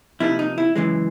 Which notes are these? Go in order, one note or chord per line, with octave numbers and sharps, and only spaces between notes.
C3 F3 A#3 D#4 E4
D#4
E4
F#2 C#3 E3 G#3